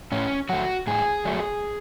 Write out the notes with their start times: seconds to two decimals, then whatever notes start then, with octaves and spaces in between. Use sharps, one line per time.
0.12 A2 C#4
0.49 F#3 A3 F#4
0.87 A2 G#4
1.25 F#3 A3